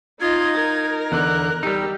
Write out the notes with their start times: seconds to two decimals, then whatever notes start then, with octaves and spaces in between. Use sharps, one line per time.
0.21 D#4 F4 D#5 G#6
0.58 A#4
1.12 E2 D3 F#6
1.63 G3 D#4 G4 E6